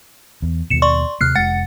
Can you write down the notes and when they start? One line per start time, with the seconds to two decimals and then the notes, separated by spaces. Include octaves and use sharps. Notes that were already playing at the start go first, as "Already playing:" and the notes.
0.42 E2
0.70 D#2 B2 C#7 E7
0.82 D5 C6 C#6
1.21 D#2 C3 A#3 F6 F#6 C7
1.35 F1 G#3 F#5 A6 C#7